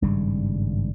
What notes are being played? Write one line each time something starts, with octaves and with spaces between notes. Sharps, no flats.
G#1 G2 C#3 G3